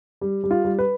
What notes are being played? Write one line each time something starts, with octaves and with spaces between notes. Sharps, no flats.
G3
G3
F4
G3
B4